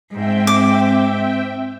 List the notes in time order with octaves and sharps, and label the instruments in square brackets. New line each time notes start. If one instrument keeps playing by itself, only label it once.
[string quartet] G#2 [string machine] C4 E5 G5
[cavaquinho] D6